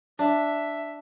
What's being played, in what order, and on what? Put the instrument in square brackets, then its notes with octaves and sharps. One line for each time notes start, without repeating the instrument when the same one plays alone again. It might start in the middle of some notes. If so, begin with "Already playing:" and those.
[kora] D4 [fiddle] E5